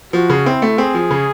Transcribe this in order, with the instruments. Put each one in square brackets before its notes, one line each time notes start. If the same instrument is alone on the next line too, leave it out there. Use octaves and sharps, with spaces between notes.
[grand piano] F3 [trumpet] F#4
[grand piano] C#3
[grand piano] C4 [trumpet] E4
[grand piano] A3
[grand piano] C4 [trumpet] G#4
[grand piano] F3
C#3